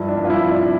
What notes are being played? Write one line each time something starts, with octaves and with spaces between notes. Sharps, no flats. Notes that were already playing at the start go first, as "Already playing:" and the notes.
Already playing: G2 F3 E4
D4
G2
F4
E4
F3
D4